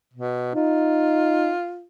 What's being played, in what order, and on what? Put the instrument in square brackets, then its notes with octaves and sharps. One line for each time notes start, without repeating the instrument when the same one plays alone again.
[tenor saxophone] B2
[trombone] D#4 [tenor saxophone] F4